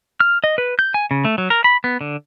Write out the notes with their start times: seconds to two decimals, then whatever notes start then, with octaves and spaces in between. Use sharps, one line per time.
0.20 F6
0.44 D#5
0.58 B4
0.79 G6
0.94 G#5
1.11 C#3
1.25 A3
1.38 F#3
1.50 A#4
1.64 B5
1.84 B3
2.01 D3